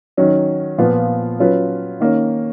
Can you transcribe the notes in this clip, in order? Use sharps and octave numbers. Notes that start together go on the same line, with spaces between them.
D#3 F#3 C#4
A#2 F3 B3 F4
F#3 C#4 F4 B4
D#3 A#3 C#4